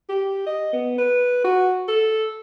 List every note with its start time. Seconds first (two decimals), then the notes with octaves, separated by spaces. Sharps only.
0.09 G4
0.46 D#5
0.73 B3
0.98 B4
1.44 F#4
1.88 A4